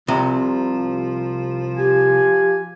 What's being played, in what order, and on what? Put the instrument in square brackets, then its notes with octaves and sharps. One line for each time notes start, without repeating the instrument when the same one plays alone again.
[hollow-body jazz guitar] C2 C3 [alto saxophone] F3
[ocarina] G4 [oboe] G#5